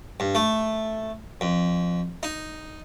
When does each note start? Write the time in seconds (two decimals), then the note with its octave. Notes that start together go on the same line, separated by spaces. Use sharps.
0.20 G2
0.35 A3
1.41 F2
2.23 D#4